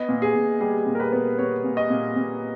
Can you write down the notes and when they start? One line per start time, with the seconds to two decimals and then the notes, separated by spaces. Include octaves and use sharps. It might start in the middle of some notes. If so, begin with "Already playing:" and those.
Already playing: B3 D#5
0.09 A#2
0.22 G#4
0.35 A#2
0.61 G3 G#4
0.86 A#2
0.95 A#4
1.00 B4
1.12 B3
1.38 B3 C#5
1.64 A#2
1.77 D#5
1.90 A#2
2.16 A#2